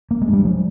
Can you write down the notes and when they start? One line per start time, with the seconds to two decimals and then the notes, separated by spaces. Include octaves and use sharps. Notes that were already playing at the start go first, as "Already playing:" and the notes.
0.11 A#3
0.22 G#3
0.28 G2
0.33 G3
0.45 F3 G#3